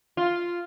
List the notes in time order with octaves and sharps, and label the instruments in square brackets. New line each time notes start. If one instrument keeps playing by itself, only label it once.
[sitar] F4